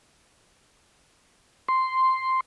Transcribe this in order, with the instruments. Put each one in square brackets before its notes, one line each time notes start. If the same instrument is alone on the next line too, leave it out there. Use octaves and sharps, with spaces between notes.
[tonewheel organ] C6